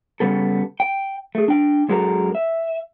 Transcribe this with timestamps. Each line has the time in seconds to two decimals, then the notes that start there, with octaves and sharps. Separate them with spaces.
0.20 C#3 G3 B3 A4
0.80 G5
1.35 A3 G#4
1.48 D4 G5
1.89 F#2 G#3 F#4 A4 A#4
2.35 E5